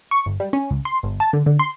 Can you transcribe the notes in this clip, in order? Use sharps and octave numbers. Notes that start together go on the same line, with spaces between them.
C#6
G1
G3
C#4
C#2
C6
G1
A5
D3
D3
C6